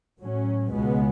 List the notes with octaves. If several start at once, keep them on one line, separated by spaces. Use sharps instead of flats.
A2 F#3 C#4
C#2 B2 G#3 B3